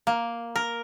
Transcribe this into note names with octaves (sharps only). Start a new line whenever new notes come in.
A#3
A#4